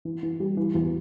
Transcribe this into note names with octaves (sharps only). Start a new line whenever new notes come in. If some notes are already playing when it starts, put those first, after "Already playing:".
E3
E3
G3
E3
E2